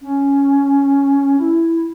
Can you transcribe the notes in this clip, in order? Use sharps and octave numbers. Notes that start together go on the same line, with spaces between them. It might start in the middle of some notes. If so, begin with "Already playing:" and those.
C#4
E4